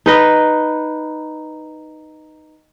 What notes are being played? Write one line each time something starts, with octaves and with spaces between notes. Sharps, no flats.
D#4 B4 D#5